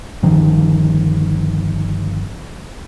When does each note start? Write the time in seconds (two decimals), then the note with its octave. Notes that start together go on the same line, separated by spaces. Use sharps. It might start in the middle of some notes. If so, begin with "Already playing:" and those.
0.23 G1 D#3 F3